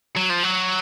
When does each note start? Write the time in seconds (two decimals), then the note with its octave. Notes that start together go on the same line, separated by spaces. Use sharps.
0.16 F#3
0.29 F3
0.43 F#3